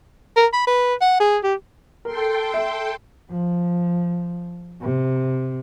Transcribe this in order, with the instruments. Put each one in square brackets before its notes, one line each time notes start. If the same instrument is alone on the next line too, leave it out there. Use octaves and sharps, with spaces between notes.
[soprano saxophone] A#4
B5
B4
F#5
G#4
G4
[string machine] A4 G5 C6 [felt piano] A#4
[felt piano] E5
[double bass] F3
C3